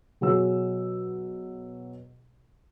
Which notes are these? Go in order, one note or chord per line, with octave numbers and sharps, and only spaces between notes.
B2 F#3 G#4 E6